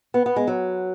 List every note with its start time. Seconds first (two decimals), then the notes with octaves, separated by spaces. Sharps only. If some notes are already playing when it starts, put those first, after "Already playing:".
0.14 B3
0.26 B3
0.36 G#3
0.47 F#3